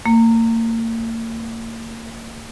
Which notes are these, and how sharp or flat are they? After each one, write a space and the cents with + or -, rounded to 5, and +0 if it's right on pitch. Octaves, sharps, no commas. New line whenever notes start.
A#3 -40